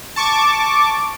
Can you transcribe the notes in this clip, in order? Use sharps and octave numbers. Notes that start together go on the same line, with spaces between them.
A5 C#6 D6